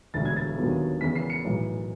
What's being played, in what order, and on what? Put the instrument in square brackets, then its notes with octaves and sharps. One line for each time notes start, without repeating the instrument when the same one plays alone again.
[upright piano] E1 D2 D3 A6
G#6
A6
D#2 D3 F#3 B3
E2 C#3 E3 B6
C7
C#7
B1 A2 E3